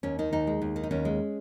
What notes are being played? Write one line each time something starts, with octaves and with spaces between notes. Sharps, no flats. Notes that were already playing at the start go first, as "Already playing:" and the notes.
D#2 C#4
D#3 D#4
D#2 D#4
G#3
D#2
D#3
D#4
D#2 C#4
G#3